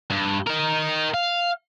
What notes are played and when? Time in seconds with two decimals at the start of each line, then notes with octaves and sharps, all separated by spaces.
0.10 G2
0.47 D#4 A#4
1.14 F5